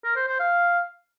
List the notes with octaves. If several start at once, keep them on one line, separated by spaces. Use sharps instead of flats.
A#4
C5
C5
F5